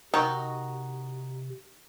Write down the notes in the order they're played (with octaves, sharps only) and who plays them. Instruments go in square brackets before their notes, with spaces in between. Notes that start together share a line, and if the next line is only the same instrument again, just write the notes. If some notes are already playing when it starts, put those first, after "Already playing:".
[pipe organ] C3 [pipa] D#3 [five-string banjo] D#4 F#4 [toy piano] A#4 C#6